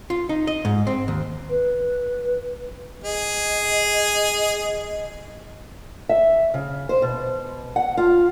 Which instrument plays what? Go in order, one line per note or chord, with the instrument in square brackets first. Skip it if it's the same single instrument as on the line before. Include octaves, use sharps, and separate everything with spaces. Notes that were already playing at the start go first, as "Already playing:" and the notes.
[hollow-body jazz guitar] F4
D#4
D#5
G#2
C4
D#2
[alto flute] B4
[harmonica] G#4 [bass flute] D#5
[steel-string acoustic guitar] E5
C#3
C5
B2
F#5
F4